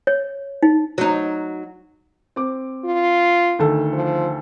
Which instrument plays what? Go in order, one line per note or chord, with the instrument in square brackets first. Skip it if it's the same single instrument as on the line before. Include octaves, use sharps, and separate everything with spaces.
[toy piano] C#5
D#4
[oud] F#3 D#4
[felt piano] C4 D6
[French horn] F4
[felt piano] D2 D#3 A4
[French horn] F3